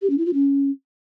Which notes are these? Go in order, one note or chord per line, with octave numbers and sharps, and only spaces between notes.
G4
C#4
E4
F4
C#4